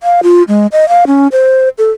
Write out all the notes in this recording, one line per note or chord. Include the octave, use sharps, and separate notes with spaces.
F5
F4
G#3
D#5
F5
C#4
C5
A4